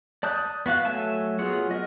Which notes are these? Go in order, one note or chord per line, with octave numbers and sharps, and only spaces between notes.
D5 A5 D#6 F#6 G6
B3 F#4 F5 F#6
F#3 A3 E5 G#5 A5
F#3 B3 F4 G#4 F#5
A#4 D#5